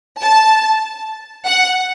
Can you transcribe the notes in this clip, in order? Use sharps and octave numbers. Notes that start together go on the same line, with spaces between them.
A5
F#5